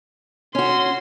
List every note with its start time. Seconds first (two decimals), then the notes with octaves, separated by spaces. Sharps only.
0.55 C#4 F#4 C6